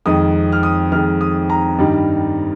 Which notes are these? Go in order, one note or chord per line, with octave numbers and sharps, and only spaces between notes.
F2 D#3 G#3 D#6
F6
D#6
F2 D#3 G#3 F6
D#6
A#5
G2 D#3 G3